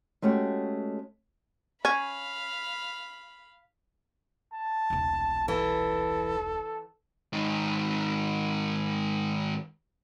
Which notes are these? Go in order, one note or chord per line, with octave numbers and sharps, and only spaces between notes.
G#3 A3 C#4 F#4 G4
C#4 F5 B5
A5
D#1 B1
E3 A4
G#2 D#3